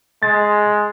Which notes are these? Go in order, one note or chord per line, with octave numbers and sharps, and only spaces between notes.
G#3 A6